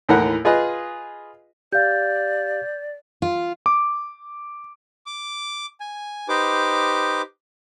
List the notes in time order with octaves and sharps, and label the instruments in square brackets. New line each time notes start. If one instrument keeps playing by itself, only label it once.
[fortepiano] D#2 A2 E3 A#4 F#5
F4 G#4 B4 D#5
[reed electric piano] G4 F5 [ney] D5 [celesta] G6
[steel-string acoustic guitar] F4
[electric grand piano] D6
[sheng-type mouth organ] D6
G#5
D#4 G4 B4 C5 D6